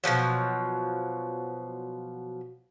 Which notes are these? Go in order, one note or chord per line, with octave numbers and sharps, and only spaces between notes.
B2 D#3 F3 F#3